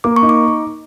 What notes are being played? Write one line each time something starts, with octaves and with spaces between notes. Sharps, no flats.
A#3 D6
C#6
D#4
D6